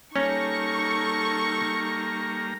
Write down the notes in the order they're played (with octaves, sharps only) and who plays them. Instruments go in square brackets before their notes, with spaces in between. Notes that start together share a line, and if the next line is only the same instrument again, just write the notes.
[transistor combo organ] G3 A#3 A#5 [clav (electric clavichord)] C#4 [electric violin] D#4 A4 [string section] C#6